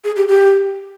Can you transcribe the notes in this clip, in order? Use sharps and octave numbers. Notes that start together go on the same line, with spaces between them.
G#4
G4
G4